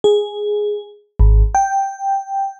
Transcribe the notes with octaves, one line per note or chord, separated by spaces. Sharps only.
G#4
G#1
G5